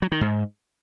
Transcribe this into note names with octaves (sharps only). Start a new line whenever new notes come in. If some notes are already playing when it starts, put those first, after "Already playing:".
F#3
D#3
G#2